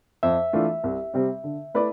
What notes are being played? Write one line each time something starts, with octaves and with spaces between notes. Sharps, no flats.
F2 E5
E3 A3 D4 F4
C2
C3 G3 C4 G4
D3
A3 E4 B4 D5